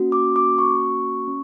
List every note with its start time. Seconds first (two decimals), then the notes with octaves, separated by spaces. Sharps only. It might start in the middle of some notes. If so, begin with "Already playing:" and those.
Already playing: A#3 C#4 F#4
0.12 D6
0.36 D6
0.58 C#6
1.27 C#4